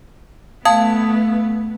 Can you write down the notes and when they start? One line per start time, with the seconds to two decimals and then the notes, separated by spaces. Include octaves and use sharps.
0.65 A3 B3 F5 A5 D#6 G#6